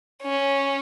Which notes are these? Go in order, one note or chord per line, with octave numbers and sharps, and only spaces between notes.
C#4